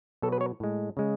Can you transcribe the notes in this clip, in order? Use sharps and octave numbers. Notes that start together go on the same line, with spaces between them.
B2 F#3 A4
B4
C#5
A2 G#3
C#3 G#3